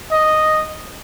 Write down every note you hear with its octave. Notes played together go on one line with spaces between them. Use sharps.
D#5